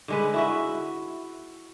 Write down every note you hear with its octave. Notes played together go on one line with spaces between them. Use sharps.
D3 G#3 B4
E4 F#4 E5